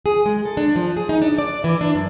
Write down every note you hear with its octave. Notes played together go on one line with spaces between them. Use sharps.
G#4
G#3
A4
D4
F3
G#4
D#4
D4
D5
E3
D4
F#2